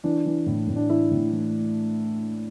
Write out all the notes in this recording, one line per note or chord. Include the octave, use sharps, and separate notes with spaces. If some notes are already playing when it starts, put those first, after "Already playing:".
E3 D4
E3
A2
A2
D4
E3 E4
A2
E3